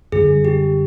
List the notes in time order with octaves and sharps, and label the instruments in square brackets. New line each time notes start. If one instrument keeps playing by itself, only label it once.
[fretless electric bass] F#2 D3 G3 [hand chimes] G#4
[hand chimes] G4